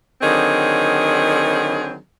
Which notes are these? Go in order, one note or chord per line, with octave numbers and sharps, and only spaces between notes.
D3 D#3 F#3 C4 G#4